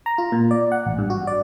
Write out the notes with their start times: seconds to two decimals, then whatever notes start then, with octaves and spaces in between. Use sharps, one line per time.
0.06 A#5
0.18 F4
0.32 A#2
0.51 D5
0.72 F#5
0.86 A1
0.98 G2
1.10 F#4
1.27 D5